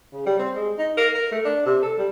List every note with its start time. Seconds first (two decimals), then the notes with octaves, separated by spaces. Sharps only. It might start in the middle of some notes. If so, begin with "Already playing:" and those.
0.13 C#3
0.26 G3
0.39 C4
0.55 G#3
0.78 D#4
0.97 A#4
1.15 A#4
1.32 A3
1.45 D4
1.66 C3
1.83 A4
1.98 G3